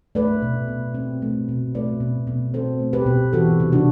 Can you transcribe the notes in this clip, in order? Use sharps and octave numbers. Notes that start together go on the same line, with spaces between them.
A3 B4 D5
B2
B2
C4
A3
B2
A3 B4 D5
B2
B2
C4 A4 C5
A3
G4 B4
B2
E3 F#4 A4
C3
D4 F#4